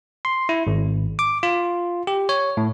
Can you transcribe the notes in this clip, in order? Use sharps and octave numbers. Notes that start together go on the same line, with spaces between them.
C6
E4
G#1
D6
F4
G4
C#5
A2